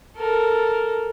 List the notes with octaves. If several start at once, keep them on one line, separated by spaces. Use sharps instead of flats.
A4 A#4